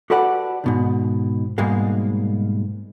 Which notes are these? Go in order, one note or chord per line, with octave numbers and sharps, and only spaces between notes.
F#4 G4 A4 B4 D5 F#5
G#2 B2 D#3
G#2 B2 G3 G#3 A#3